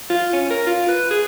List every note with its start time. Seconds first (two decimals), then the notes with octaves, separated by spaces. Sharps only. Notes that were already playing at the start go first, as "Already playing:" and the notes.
0.10 F4
0.33 C#4
0.51 A#4
0.66 F4
0.88 B4
1.11 G#4